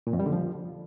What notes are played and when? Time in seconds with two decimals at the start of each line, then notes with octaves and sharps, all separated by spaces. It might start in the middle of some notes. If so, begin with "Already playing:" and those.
0.07 A#2
0.13 F2
0.20 G3
0.26 D3
0.32 F3